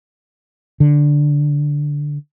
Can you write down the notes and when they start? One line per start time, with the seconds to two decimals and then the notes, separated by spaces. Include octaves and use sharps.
0.80 D3